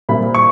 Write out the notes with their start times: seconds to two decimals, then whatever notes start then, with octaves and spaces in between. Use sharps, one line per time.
0.09 A#2 G3 C4 E4 B5
0.35 C#6